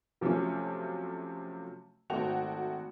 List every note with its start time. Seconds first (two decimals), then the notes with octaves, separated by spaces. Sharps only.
0.21 C3 F3 F#3 A3 C#4
2.10 G#1 A3 F#4 G5 F7